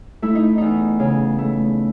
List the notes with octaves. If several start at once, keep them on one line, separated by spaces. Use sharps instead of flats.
A3 E4
D#4
E2 D#4
C#3
A3